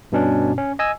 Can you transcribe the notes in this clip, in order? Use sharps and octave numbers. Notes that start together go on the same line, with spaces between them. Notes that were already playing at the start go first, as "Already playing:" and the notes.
G2 B2 C#4 D4
C#4
D#5 G#5 E6